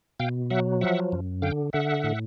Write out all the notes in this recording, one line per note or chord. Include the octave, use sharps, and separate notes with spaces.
B2 F5 G5
F#3 E5 F#5
F3 E5 F#5
F#2
D3 F5 G5
D3 E5 F#5
A2